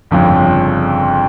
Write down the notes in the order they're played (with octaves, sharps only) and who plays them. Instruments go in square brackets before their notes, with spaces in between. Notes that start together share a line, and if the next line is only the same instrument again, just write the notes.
[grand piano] G1 F2 C#3 F3